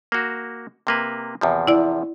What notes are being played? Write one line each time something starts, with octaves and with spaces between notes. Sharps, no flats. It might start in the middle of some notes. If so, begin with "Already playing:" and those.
A#3 F#4
C3 A#3 B4
E2 C3 F3
E4 D5